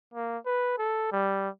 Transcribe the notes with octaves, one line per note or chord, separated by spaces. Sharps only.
A#3
B4
A4
G3